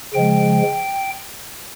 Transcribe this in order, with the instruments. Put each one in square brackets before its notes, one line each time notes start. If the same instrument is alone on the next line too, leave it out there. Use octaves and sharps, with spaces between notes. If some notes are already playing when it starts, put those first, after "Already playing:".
[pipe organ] C#3 F3 G#3 G5